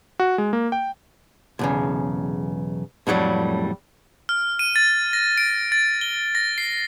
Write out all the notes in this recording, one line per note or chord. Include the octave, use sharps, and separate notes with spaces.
F#4
G#3
A#3
G5
B1 E2 C#3
F2 A2 F#3 G3
F6
D#7
A6
A#6
D7
A6
G7
A#6
C7